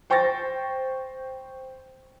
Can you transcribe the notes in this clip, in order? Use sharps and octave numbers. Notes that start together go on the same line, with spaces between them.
C5 G5 C#6 A6 A#6